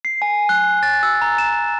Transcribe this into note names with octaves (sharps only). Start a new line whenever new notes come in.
C7
G#5
F#6
A6
E6
A#5
E7